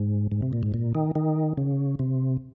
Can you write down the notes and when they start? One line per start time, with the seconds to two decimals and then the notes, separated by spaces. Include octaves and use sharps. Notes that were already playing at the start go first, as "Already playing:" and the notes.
Already playing: G#2
0.31 G#2
0.42 C3
0.53 A#2
0.63 G#2
0.74 A#2
0.95 D#3
1.15 D#3
1.57 C#3
1.99 C3